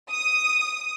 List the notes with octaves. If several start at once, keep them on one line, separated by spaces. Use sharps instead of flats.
D#6